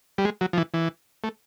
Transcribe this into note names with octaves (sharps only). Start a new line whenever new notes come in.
G3
G#3
F#3
F3
E3
E3
A3